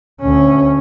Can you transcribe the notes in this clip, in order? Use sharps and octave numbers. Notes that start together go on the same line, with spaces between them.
D2 C#4